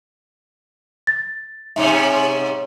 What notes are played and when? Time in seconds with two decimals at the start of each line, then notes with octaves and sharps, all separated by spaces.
1.07 A6
1.76 G#2 C3 C#4 E5